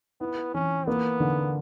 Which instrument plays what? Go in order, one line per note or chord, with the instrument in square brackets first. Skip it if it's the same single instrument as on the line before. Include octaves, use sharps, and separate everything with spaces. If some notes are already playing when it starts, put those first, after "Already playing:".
[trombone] B3 [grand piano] E4
[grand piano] E3 [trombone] C#4
[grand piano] A#3 [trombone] B3
[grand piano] D3